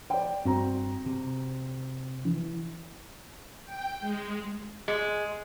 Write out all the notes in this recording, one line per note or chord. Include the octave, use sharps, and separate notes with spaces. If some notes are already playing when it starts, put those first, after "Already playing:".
D5 G5
G2 C4 F#4 A#5
C3
E3
G5
G#3
G#3